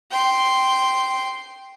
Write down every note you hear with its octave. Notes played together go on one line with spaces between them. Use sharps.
G5 C6